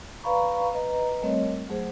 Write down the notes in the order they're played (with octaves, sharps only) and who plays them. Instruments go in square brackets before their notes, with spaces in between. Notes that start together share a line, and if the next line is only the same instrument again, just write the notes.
[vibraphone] B4 D5 F5 A#5 B5 C#6
B4 D#5 A#5
G3 A3 C4 A#4 C#5 D#5
F#3 A3 G#4 C5